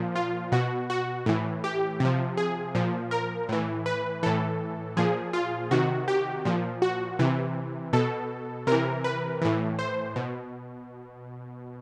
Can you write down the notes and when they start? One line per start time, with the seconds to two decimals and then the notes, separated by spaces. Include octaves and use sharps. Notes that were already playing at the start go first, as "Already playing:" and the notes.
Already playing: A#2 F3
0.15 F4
0.52 B2 F#4
0.90 F#4
1.26 A2 E3
1.64 G4
2.00 C3 F3
2.37 G#4
2.75 A#2 F3
3.11 A#4
3.49 A2 E3
3.86 B4
4.23 A2 E3 A4
4.97 A#2 F3 G#4
5.33 F4
5.71 C3 D#3 F#4
6.08 G4
6.45 A#2 F3
6.82 F#4
7.19 C3 E3
7.93 B2 A4
8.67 C3 E3 A#4
9.04 B4
9.42 A2 E3
9.79 C5
10.16 B2